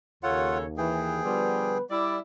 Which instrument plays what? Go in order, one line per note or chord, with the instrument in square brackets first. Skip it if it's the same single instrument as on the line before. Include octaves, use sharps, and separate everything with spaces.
[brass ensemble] D#2 [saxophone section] C#3 A4 C#5 [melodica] F4 F#5
[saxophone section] E3 [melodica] G#4 G5
[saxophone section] D3 F3 G3 [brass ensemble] B3 B4
[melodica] G3 [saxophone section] E4 D5